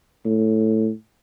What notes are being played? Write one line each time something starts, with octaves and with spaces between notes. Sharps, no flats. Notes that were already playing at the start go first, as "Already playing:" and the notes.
A2